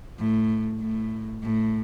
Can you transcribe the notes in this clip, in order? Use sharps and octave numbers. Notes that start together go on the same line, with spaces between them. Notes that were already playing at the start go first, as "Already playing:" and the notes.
A2
A2
A2